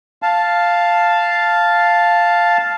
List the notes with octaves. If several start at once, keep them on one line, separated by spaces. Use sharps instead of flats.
F5 A5